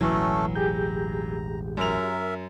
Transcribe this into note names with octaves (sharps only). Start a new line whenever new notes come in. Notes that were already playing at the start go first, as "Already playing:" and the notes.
E1 A1 E3 F#3 A3 C#4 A4
G4 G#4 A#5 G6
F#2 A#4 E5 F7